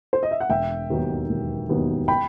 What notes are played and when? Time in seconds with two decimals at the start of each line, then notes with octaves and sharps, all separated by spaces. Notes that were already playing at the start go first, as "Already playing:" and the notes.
0.13 C5
0.23 D#5
0.31 E5
0.40 F#5
0.49 E1 E5 G5
0.90 D#2 D#3 F#3 B3
1.29 E1
1.69 D#2 D#3 F#3 B3
2.08 G5 B5